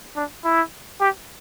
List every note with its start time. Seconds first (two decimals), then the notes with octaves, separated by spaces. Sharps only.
0.16 D4
0.45 E4
1.01 G4